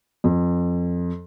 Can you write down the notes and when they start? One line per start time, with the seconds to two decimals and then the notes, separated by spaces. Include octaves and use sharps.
0.24 F2